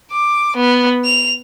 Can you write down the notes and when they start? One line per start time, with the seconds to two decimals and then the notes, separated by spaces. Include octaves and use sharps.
0.11 D6
0.57 B3
1.05 F7